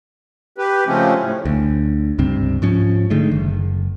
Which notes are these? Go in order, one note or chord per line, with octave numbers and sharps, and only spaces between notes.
G4 B4
C#3 F3 G#3 A3 C4 C#4
A2
D2
C#2 G2 C3 C4
G#2 F3 C#4
D3 D#3 G#3 A3
F#1